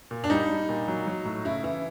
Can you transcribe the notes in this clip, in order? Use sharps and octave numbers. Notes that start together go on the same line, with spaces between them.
A#2
D4
G3 D#4
G3
A#2
F#3
F#3
A2
C#3 E4
E3 E4